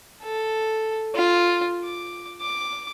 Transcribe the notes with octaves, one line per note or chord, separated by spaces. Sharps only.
A4
F4
D6
D6